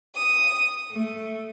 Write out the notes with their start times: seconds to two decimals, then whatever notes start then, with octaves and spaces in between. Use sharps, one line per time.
0.14 D#6
0.91 A3